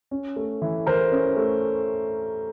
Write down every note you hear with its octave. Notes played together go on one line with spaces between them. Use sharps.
C#4
A3
E3
E3 A#4 C5
C#4
A3